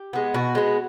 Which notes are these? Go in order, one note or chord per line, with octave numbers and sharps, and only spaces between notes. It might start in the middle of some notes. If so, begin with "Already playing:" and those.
Already playing: G4
G#3 B3
B2 F#4
G#3 B3